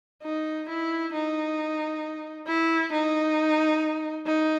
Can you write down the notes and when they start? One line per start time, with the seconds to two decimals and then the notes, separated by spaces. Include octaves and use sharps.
0.23 D#4
0.69 E4
1.14 D#4
2.47 E4
2.92 D#4
4.26 D#4